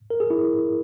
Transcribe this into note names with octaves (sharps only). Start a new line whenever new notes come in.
A#4
G#4
E4